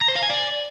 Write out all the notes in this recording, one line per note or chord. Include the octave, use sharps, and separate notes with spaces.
A#5
C5
F5
G#5
D5